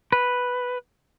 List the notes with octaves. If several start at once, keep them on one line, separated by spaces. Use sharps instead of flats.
B4